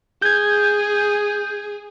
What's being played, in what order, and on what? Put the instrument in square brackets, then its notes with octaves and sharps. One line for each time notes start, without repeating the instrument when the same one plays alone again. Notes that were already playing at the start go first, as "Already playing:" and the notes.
[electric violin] G#4 [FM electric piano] G6 G#6